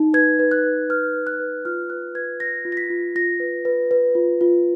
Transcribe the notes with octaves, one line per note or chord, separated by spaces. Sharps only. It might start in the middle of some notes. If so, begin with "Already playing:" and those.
Already playing: D#4
B4 G#6
B4
F#6
B4
B4 F6
B4
F#6
B4
F4 F6
B4 F#6
B4 G#6
B4 A#6
F4
A#6
B6
F4
F4 A#6
B4
B4
B4
F4
F4